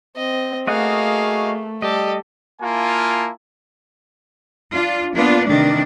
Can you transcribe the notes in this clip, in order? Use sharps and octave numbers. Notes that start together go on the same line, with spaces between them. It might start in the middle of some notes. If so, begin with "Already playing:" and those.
C4 D#5
A3 A#3 F#4 G#4 D#5 F5 F#5
G3 G4 A4 D#5
A#3 E4 F4 G#5 A5
D4 F4
A#3 B3 D4 F4
C3 D#3 E3 A3 D4